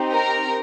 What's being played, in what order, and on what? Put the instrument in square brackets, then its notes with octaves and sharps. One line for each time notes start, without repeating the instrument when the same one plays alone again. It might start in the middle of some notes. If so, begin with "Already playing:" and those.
Already playing: [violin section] C4 D#4 G4
A#4 A#5